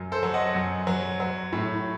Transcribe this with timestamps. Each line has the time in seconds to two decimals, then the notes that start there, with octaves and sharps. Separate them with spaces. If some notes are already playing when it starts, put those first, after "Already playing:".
Already playing: F#2
0.12 A4 C5
0.23 F#3
0.34 D#5 F#5
0.55 F#2
0.87 F#3
1.20 F#3
1.53 A2